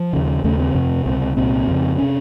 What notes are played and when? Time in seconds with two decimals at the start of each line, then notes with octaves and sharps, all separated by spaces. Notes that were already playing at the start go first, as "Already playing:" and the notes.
Already playing: F3
0.13 D#2 C#3
0.44 D#2 C#3 A3
0.60 C4
0.75 F2 C3
1.06 C#2 C3 C4
1.37 C2 A#2 C4
1.68 F2 C#3
1.98 C3 C#4